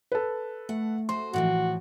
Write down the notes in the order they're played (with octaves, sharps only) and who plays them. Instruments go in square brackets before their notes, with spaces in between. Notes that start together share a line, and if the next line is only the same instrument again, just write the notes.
[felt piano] A4 B4
[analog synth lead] A3 [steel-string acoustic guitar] F#5
[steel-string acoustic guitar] F#4 C5 [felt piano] C6
[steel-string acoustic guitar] A2 E3 F3 [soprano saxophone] F#4